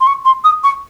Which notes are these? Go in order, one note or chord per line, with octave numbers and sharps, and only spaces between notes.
C6
C#6
C6
D#6
C#6